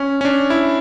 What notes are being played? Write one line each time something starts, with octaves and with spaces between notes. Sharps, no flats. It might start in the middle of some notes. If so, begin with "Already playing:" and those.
Already playing: C#4
C#4
D4
E4